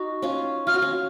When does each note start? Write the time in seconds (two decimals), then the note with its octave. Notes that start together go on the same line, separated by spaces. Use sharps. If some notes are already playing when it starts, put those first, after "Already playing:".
Already playing: D#4 F#4
0.22 C#4 F4
0.67 F4 F6
0.74 F#4
0.82 C#4 F4